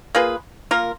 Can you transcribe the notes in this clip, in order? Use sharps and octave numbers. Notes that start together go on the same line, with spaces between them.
A#3 F4 G#4 B4
A#3 F4 A#4